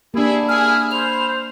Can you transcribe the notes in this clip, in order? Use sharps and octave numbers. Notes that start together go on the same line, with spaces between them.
A#3 D4 E4 G4 G#4
E4 G#4 G#5 F6
C5 B5 F7